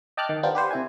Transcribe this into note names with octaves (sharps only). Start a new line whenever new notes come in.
D#5 G5 A5 D6 F6 F#6
D#3
B3 D4 F4 G4 A#4 C5
G4 B4 C5 F#5
C3 E4 G#5